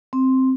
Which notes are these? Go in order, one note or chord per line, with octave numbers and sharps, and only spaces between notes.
C4